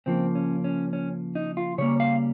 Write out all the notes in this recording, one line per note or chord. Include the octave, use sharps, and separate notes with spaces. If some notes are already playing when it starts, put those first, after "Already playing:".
C#3 F3 A#3 C4
C#4
C#4
C#4
D#4
F4
C#3 G3 A#3 C#5
F5